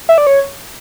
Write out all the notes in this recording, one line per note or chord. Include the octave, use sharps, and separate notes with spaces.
E5
D5
C#5